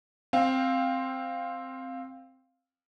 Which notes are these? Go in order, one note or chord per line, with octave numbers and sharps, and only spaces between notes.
C4 F5 G5